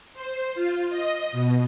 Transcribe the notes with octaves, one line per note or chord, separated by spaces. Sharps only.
C5
F4
D#5
B2